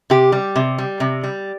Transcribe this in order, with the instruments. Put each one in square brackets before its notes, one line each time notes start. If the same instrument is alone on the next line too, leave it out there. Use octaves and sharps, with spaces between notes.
[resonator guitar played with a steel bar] C3 G4
G3
C3
G3
C3
G3